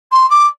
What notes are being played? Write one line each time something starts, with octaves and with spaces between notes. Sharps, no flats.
C6
D6